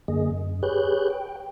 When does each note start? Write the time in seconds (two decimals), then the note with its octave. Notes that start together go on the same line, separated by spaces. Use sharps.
0.08 F#2 D3 A#3 G#4 D#5
0.31 F#2
0.63 G4 G#4 B4 C#5 F#6 G6
1.10 G5